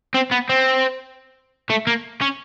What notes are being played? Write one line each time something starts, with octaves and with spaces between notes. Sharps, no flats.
C4
B3
C4
A3
A#3
C#4